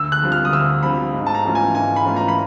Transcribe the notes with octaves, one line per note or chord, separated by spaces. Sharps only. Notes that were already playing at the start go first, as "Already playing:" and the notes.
Already playing: D2 E6
F#6
D3 G3 C4 F4
F6
D#6
D2 E6
D3 G3 C4 F4 B5
G#2
A5
A#5
E3 A3 C#4 F4
G#5
G#2 G#5
B5
E3 A3 C#4 F4
A#5
B5